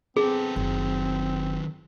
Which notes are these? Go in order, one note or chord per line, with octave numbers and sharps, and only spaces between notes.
B3 C4 G#4 A4
F#1 D#3 F#3